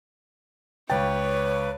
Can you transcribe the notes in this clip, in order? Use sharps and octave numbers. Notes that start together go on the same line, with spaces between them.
C#2 B4 C#5 G5 A6